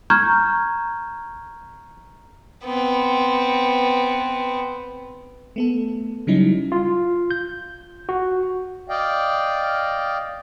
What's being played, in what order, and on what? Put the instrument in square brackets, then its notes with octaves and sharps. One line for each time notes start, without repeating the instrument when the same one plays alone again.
[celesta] A#5 C#6 F6 G6 G#6
[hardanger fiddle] B3 C4
[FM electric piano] A3 B3 A4
C#3 F#3 G3 C#4 D#4 E4
[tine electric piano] F4
G6
F#4
[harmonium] D5 D#5 F5 G5